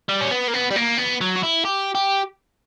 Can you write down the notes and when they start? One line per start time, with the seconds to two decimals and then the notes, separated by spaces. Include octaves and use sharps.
0.09 G3
0.21 C#4
0.31 B3
0.48 A#3
0.54 B3
0.70 G3
0.76 A#3
0.98 B3
1.21 F#3
1.36 F#4
1.43 E4
1.65 G4
1.95 G4